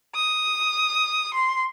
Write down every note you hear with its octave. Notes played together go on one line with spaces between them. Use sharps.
D#6
C6